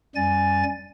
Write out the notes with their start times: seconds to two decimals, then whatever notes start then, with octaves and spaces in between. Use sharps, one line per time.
0.15 F#2 G3 G#5 A6